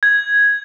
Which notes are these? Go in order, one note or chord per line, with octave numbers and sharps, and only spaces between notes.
G#6